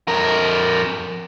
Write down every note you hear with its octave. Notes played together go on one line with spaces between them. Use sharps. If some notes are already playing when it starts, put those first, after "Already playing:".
F2 A#4